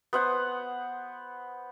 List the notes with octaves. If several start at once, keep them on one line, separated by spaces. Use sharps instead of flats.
B3 C5 F#5